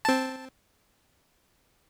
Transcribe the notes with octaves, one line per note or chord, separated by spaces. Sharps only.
C4 A5